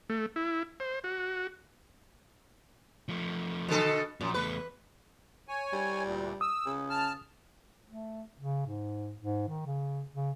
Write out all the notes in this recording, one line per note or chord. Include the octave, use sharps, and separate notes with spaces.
A3
E4
C5
F#4
F3 A3
B2 D3 A4
F#2 A#2 F3
E2 A3 B4
C#5 G#5
G3
D2 A#2
D#6 E6
C#3
A5 F6
A3
C#3
G#2
G#2
D#3
C#3
C#3